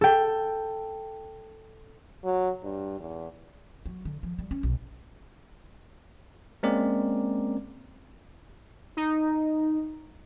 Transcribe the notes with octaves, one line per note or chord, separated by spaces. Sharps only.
A4 G5
F#3
G2
E2
F#3
D3
F3
G3
C#4
B1
G#3 A#3 C4 C#4 A#4 D5
D#4